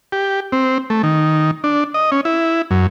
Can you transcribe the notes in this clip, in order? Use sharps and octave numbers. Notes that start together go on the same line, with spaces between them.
G4
C4
A3
D#3
D4
D#5
C#4
E4
F#2